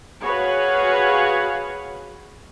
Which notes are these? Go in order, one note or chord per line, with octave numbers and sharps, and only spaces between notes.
F#4 G#4 B4 C#5 F5 F#5